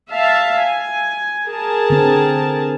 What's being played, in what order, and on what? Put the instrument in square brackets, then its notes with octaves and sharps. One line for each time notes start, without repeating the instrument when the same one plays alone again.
[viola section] E5 F5 A5
G#5
G#4 A#4 A5
[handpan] D3 C4